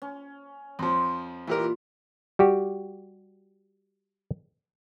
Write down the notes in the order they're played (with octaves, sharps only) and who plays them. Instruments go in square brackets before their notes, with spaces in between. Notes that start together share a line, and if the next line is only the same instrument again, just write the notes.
[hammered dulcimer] C#4
[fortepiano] F2 F3 [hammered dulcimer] C6
[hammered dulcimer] A#2 [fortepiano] E3 G4 A#4
[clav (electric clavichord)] G3 F#4 G4